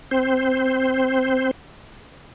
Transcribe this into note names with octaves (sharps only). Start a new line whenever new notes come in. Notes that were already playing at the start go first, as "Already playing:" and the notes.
C4 C5